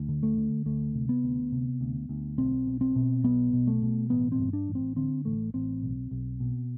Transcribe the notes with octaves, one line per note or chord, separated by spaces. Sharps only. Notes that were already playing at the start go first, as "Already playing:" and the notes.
Already playing: D2
D3
A3
D3
D2 A3
C3
B3
D2
C3
D2
D2
B1 C4
B2
C4
B2
B1 B3
B2
A3
B2
A1 B3
C4
G2
D4
A1
C4
D3 C4
A1 A3
A1 C4
B1
B1
B2